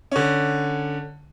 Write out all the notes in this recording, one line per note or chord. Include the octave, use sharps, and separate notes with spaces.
D3 C#4